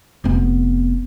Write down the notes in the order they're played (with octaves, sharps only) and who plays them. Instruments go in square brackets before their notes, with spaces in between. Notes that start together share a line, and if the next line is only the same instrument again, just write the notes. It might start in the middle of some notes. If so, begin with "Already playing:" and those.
[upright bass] F1 B3